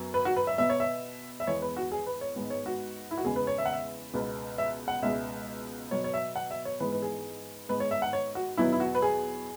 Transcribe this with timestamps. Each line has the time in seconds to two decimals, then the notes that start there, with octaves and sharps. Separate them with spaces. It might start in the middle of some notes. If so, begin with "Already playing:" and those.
Already playing: F#2 F#3 B3
0.14 B4
0.25 F#4
0.36 B4
0.47 E5
0.58 B2 B3 E5
0.70 C#5
0.80 E5
1.40 E5
1.47 E2 E3 G#3 B3 C#5
1.62 B4
1.77 F#4
1.92 G#4
2.07 B4
2.21 C#5
2.36 G#2 G#3 B3
2.50 C#5
2.66 F#4
3.11 E4
3.18 F#4
3.25 E2 C#3 G#3 B3 G#4
3.36 B4
3.47 C#5
3.58 E5
3.65 F#5
3.73 E5
4.14 C#2 B2 B3
4.58 E5
4.88 F#5
5.02 C#2 B2 G#3 B3 E5
5.91 B2 F#3 B3 C#5
6.04 C#5
6.14 E5
6.36 F#5
6.51 E5
6.65 C#5
6.80 G#2 E3 G#3 B3 B4
6.92 B4
7.02 G#4
7.69 G#2 G#3 B3 B4
7.80 C#5
7.91 E5
8.02 F#5
8.13 C#5
8.35 F#4
8.57 E2 B2 F#3 B3 E4
8.72 E4
8.80 F#4
8.95 B4
9.02 G#4